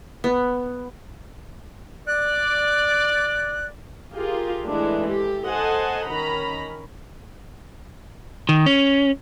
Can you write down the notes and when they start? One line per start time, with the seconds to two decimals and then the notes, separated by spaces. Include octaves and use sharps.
0.24 B3
2.07 D5 F#6
4.15 F4 G4 G#4 A#4
4.66 E3 G#3 A3 D4
5.11 G4 A4
5.49 A4 C5 D#5 F#5 G#5 A5
6.08 D#3 C#4 A#5 B5
8.49 D#3
8.66 C#4